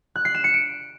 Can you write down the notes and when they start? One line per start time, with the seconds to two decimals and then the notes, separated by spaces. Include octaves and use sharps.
0.16 F#6
0.25 C7
0.35 E7
0.44 C#7
0.54 D7